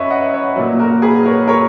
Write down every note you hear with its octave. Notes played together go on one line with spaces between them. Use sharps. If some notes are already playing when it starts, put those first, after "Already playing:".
Already playing: F#2 B4 C#5 D#5 E5
D#5 F#5
C#5 E5
A#2 F#3
F#4 A#4
G#4 B4
A#4 C#5
A#4 C#5